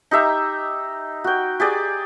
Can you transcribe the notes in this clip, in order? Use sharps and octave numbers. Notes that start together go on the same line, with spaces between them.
D#4 G4 E5 A#5
F#4 G5
G4 G#4 D5